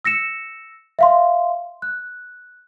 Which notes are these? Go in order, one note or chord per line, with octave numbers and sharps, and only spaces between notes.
E6 A#6 C#7 E7
E5 F5 C6
F#6